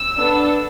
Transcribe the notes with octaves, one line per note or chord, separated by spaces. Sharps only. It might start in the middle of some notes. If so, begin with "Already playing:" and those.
Already playing: E6
B3 D4 A4